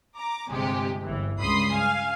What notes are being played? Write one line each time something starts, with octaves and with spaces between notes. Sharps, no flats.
A#5 D6
G1 C3 G#3 G4
G1 E3
C#2 G2 B5 C6 D#6 C7
F5 G#5